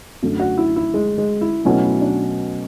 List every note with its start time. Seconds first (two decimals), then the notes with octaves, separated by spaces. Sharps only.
0.22 F#2 D3 A3
0.40 F#4
0.58 E4
0.76 E4
0.94 G#3
1.18 G#3
1.41 E4
1.65 B2 F#3 A3 C#4 E4
1.83 E4
2.01 D4